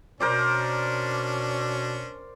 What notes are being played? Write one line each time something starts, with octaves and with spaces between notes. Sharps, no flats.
B2 C#4 D4 A#4 C5 D5